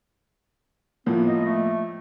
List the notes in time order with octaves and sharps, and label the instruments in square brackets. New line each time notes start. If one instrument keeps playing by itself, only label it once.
[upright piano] A2 F3 A#3 [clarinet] B3
[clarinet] D#5
A3